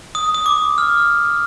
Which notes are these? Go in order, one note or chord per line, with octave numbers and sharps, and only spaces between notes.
D#6
D#6
D6
F6